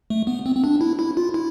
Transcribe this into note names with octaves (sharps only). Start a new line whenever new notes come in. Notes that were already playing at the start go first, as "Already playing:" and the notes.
A3
B3
C4
C4
D4
E4
E4
F4
E4